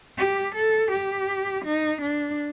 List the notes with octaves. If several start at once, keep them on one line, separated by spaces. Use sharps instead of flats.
G4
A4
G4
D#4
D4